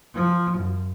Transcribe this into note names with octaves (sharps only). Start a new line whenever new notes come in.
F3
F#2